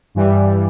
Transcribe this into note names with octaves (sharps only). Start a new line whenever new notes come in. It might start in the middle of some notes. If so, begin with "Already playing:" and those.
G2 E3 G3